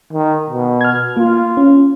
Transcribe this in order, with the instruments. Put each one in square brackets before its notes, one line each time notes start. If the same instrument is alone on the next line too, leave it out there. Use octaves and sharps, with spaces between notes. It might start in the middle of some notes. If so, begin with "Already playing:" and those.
[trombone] D#3
B2
[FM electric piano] F6 G#6
[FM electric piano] A#3 [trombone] F4
[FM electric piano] C#4